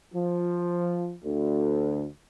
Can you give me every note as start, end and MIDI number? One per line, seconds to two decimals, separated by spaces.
0.14 1.15 53
1.24 2.07 38